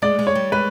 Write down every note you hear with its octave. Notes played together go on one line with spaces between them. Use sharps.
G#3 D5
G#3
C#5
G3
G#3 B4